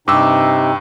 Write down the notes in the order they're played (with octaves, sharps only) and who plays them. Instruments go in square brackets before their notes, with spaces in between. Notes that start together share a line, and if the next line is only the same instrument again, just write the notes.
[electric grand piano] G2 E6 [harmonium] C3 D#4 [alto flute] G5 [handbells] D6